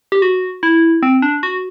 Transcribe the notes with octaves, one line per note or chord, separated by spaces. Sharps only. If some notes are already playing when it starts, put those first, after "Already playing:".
G4
F#4
E4
C4
D4
F#4